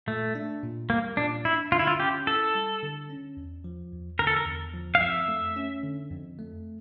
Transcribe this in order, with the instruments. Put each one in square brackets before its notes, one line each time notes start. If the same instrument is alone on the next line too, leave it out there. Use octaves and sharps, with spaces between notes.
[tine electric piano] A#2 [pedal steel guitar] A3
[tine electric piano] D4
A#2
[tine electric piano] G3 [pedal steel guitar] A#3
[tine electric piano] A#2 [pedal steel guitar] D4
[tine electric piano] D4 [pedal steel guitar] E4
[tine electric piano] D3 [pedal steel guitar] F4
[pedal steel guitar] E4
F4
[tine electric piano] C#4 [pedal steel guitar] G4
[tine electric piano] E4 [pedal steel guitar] A4
[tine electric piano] G3
D3
C#4
E2
F3
E2
[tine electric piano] D3 [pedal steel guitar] A#4
[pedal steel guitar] A4
A#4
[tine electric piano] E2
F3
[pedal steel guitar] F5
[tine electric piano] F2 [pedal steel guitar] E5
[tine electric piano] A3
C#4
D3
F2
A3